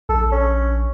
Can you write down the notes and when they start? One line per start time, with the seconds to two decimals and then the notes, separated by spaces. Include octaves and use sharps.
0.09 A#1 A4
0.32 C#4